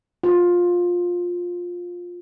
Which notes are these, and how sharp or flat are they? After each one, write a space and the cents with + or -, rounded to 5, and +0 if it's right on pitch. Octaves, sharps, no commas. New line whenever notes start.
F4 +15